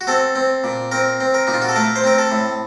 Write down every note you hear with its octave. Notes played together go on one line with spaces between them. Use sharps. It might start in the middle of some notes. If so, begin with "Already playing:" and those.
F#4
C4 A4
C4
A#2
C4 A#4
C4
A#4
A#2 D#4
F4
F#4
A4
A3 A#4
C5
C4 A#4
A4
A2